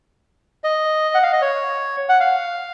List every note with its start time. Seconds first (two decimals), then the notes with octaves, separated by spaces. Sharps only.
0.64 D#5
1.15 F#5
1.23 F5
1.33 D#5
1.42 C#5
2.09 F#5
2.20 F5